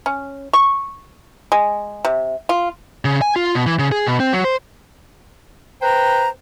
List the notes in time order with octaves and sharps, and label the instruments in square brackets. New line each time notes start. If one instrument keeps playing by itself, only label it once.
[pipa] C#4
C#6
G#3
C3
F4
[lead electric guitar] C#3
G#5
F4
B2
E3
C#3
G#4
B2
C4
F#3
C5
[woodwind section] B4 C5 G5 A#5